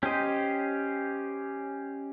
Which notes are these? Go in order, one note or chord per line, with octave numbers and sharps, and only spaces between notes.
C#4 G4 C5 D#5